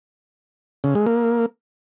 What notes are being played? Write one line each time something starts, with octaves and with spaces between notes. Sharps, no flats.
C#3
G#3
A#3